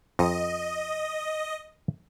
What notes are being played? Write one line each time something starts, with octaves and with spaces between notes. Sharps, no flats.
F2 D#5